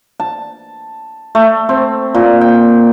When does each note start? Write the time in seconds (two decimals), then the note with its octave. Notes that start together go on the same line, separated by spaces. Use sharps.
0.20 A5
1.35 A3
1.69 C4
2.15 A#2
2.41 G5